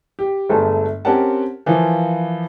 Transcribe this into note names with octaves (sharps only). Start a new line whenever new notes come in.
G4
G1 G#3 A3 A4 G#5
C4 C#4 G4 A#4 F#5 A5
E3 F3 F4 A#4